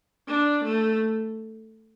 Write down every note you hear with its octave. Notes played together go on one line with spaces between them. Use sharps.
D4
A3